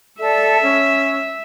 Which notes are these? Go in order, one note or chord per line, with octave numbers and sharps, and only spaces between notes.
A4 D5 E5
C#4